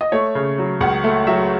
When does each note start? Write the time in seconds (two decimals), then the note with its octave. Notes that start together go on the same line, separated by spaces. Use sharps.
0.01 D#5
0.12 A3 C#5
0.35 C#3
0.58 F#3
0.81 C#2 F#5
1.04 A3
1.27 F#3 E5